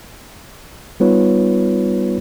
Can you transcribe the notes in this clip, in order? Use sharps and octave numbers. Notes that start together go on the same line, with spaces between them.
G3 B3 D#4 F4 B4 C#5